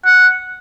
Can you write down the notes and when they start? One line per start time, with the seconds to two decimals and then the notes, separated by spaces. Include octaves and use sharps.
0.05 F#5